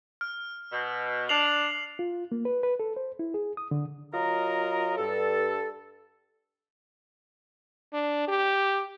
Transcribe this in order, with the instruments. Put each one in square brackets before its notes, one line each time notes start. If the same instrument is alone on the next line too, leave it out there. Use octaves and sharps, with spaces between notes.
[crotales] F6
[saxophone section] B2
[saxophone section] D4 [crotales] C7 F7 F#7
[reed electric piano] F4
A#3
B4
B4
A4
C5
E4
G#4
D#6
D3
[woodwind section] F#3 F4 A#4 D#5 A#5
G2 A4
[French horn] D4
G4